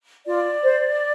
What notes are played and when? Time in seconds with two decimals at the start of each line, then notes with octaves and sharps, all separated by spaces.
0.26 F4 D5
0.63 C5